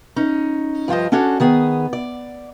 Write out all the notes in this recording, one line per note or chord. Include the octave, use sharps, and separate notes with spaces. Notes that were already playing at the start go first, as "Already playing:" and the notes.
C#4 D#4
G2 F3 F4 C5 D#5
C#4 D4 F#4 A4 C#5 D5
D#3 B3 G#4
D5